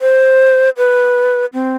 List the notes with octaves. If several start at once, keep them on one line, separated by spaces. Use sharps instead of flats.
C5
B4
C4